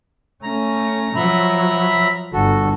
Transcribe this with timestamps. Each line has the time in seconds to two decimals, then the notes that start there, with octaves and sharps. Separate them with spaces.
0.43 A3 C#4 A#5
1.16 F3 F#3 E5 A#5 B5
2.33 G1 F#4 A4